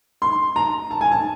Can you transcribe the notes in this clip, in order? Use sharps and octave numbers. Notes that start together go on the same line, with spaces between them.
C6
A#5
A5
G#5
A5